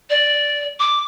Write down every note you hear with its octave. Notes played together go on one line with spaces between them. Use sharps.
D5
D6